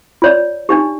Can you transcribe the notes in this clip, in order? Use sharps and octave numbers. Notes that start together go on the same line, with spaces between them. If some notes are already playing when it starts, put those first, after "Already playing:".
F4 C#5 D5
D4 D#4 G4